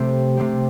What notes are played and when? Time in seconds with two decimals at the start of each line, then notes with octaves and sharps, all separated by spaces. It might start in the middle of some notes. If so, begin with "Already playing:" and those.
Already playing: C3 A3 C4 G4
0.37 C3 A3 C4 G4